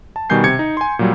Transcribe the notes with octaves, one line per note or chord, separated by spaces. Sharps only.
A5
B2 D#3 G3 G#5 G6 C7
C3 G#6 C#7
D#4
G#5 C6
A#2 F#3 G3